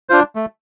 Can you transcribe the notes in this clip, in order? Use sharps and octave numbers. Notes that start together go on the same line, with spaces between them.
D4 F4 C5
A3